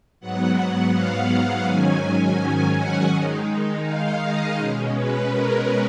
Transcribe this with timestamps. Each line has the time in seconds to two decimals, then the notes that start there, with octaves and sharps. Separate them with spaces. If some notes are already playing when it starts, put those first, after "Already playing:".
0.20 G#2 F#3 B3 F#5
0.57 F#5
0.93 F5
1.66 G#2 D#3 F#3 C#4 G#5
2.75 F#5
3.12 D#3 G#3 D#4
3.85 F5
4.21 D#5
4.57 B2 G#3 C#4
4.95 B4
5.30 A#4